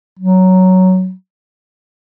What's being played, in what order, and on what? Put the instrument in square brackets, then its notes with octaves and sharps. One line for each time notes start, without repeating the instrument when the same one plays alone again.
[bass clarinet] F#3